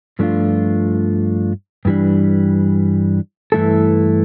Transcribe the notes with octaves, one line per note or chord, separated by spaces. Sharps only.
G2 F3 A3 D4 F4
G2 E3 G3 D4
G2 E3 A3 E4 A4